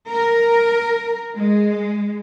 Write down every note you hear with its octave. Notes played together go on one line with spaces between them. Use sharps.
A#4
G#3